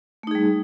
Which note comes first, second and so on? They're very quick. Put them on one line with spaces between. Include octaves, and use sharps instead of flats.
A3 D#4 G#4 G3